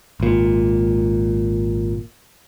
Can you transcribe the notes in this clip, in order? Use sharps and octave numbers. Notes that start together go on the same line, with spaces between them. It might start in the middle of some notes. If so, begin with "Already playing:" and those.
G#1 A#2